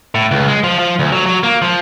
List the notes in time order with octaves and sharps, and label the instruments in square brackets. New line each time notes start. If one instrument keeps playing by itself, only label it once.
[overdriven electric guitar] A2
C#2
G#3
F3
F3
D2
F#3
F#3
A#3
F3